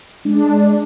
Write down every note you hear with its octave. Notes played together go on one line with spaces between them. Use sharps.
G#3 D4